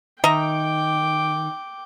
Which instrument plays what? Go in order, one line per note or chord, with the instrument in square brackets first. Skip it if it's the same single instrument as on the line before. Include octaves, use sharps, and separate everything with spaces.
[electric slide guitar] D#3 [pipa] D#5 E5 A#5 [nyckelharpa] G5 D6